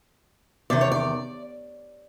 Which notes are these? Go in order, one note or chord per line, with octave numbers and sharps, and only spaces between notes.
E2 C3 D#3 D5
C#5
D5